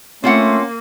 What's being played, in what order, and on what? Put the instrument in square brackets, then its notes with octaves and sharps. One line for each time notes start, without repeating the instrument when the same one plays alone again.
[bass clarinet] A3 [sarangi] A#3 [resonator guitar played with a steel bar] C4 F4 F#5 [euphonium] C#4